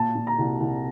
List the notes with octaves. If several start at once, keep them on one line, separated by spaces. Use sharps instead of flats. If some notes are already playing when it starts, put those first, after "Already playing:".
Already playing: A#2 A5
A#2
A#5
C2
C2